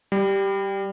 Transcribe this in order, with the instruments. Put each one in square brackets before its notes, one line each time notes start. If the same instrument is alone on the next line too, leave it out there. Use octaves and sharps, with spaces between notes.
[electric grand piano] G3